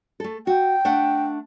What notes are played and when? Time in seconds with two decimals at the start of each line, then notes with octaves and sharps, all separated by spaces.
0.20 A3 A4
0.47 F#4 G5
0.85 A3 D4 F#5